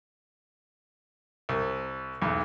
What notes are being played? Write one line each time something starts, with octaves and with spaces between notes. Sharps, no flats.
C2
B1 E2